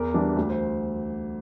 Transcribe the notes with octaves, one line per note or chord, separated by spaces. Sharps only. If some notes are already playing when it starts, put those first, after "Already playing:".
Already playing: E2 A#4
E3 G3 D4
D2
C5